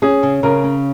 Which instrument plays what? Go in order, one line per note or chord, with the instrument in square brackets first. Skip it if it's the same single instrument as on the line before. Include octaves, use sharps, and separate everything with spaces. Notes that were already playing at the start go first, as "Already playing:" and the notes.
[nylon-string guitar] C#4 [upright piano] G#4
[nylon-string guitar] C#3
[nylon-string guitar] C#3 [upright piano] A#4
[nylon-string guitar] C#4